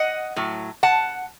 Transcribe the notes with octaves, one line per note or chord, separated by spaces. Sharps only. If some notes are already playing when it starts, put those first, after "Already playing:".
Already playing: D#5 F#5
A2 F#3
F#5 A5